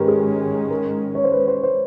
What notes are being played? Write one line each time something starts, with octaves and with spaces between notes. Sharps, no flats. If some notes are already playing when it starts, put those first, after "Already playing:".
Already playing: G#2 D#3 G#3 C#4 G4 A#4 B4
G#4
A#4
C#5
C5
B4
C5
C5